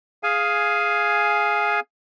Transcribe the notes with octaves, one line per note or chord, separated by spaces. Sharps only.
G#4 F5 G#5